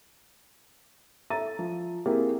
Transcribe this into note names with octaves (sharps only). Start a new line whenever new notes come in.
A4 E5 A#5 A6 D#7
F3
A#3 C4 E4 G4 G#4 A#4